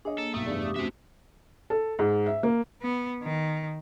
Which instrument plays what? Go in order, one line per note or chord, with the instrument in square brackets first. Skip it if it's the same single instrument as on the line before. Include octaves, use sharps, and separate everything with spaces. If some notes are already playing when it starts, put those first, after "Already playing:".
[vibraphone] D4 C#5 [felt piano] G#4 D#5
[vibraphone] A#3 [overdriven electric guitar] A4
[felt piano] B1 D#6 [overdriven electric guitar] A3
[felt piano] F1 E2 G2 [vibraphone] D5 F5
[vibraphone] G4 D6 D#6
[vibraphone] A3 C#4 F#4 [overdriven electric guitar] C4 E5
[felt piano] A4
G#2
E5
A#3
[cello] B3
D#3